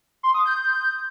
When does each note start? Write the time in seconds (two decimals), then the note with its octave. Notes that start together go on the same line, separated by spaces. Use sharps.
0.23 C6
0.34 D#6
0.46 G6